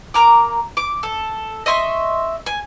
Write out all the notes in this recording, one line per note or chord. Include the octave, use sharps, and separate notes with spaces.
A#3 A#5 D6
D6
A4
D#5 E5 C6 C#6
G#5